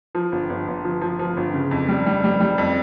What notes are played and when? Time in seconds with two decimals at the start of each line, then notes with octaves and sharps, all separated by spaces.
0.15 F3
0.32 G1
0.50 G1
0.68 G1
0.85 F3
1.01 F3
1.19 F3
1.37 G1
1.54 C#3
1.71 F2
1.89 G3
2.06 G3
2.24 G3
2.40 G3
2.58 F2